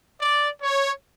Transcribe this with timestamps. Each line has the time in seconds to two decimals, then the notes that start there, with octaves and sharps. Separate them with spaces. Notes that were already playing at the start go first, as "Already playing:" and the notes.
0.21 D5
0.62 C#5